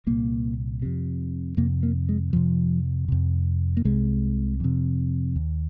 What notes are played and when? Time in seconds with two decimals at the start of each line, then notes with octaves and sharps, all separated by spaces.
0.07 C2 A#2 A#3
0.82 F2 C3
1.57 F2 C3 A#3
1.83 A#3
2.09 G#3
2.33 F2 C3 F3
3.08 F2 C3
3.77 A#3
3.85 C2 C3 G#3
4.60 F2 C3
5.36 D#2